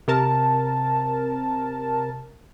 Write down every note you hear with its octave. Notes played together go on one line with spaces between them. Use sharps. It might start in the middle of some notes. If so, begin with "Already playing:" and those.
C3 A#4 A5